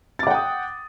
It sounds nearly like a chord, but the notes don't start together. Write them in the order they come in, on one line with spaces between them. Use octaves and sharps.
A6 D6 F#5 G5 D#6